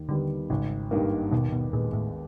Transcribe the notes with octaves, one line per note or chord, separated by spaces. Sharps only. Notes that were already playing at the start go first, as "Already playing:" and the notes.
Already playing: D#2
D3 D#3 G3 B3
G#1 C#3
G2 D#3 G3 A#3
D#2 B2
B2
A#2 D#3 G#3 B3 D#4
A2